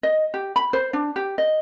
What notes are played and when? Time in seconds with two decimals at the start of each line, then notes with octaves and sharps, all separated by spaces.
0.03 D#5
0.34 G4
0.56 B5
0.73 C5
0.93 D4
1.16 G4
1.38 D#5